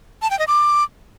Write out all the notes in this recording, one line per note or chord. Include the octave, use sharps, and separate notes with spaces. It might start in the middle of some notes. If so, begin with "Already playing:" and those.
A5
G5
D#5
D6